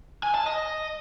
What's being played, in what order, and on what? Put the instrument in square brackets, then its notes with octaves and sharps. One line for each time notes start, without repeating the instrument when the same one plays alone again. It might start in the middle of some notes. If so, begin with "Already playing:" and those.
[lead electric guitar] G#5
A5
D#5